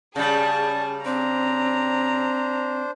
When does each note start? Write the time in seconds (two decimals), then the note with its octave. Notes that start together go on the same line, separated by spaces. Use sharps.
0.16 C#3 G3 G#4 D5 A5
1.05 C4 D4 C5 A#5